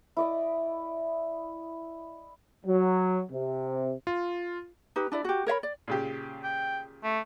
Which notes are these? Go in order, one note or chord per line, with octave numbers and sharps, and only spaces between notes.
E4 D5 D#5
F#3
C3
F4
D#4 G4 B4
D4 E4 D5
F#4 G4
A#4 C#5 E5 B5
D5
A#2 C#3 G4
G5
A3